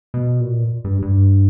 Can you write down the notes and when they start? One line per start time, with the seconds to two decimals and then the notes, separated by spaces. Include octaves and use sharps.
0.14 B2
0.41 A#2
0.84 G2
1.02 G2